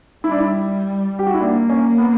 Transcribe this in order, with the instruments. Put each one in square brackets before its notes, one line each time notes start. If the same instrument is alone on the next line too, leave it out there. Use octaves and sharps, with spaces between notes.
[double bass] G3 [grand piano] E4
[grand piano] D4
E4
G4
F#4
E4
[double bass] A#3 [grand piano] D4
[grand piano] C#4
B3